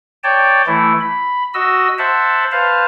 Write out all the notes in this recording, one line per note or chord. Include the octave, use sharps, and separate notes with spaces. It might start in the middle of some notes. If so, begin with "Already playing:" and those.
C#5 D5 G5 A5
E3 A3 E4
B5
F#4 D#5 E6
C5 E5 F#5 A5
B4 C5 F5 A5